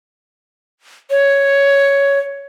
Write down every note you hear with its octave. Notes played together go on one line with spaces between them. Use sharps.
C#5